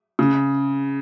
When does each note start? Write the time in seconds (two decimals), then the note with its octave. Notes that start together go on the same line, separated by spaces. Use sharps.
0.19 C#3